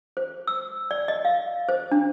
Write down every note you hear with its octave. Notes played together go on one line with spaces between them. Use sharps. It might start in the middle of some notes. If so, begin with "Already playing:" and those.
C5
E6
D5
D#5
F5
C5
D4